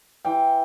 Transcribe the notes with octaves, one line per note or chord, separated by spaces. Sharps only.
E3 G5